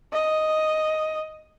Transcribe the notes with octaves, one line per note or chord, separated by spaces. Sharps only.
D#5